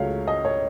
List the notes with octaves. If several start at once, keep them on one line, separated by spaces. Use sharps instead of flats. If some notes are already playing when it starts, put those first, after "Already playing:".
Already playing: C#2 C#3 F#3 A3 C#5 F5
D#5
C#5